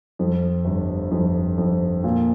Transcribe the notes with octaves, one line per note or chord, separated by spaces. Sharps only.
F2
G1
F2
F2
A#2